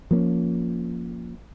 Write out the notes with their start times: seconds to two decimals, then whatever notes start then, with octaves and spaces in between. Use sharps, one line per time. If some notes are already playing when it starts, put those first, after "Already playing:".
0.11 F3 A#3 B3 C#4